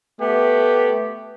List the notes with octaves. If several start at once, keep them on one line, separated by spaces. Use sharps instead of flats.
A3 B3 G4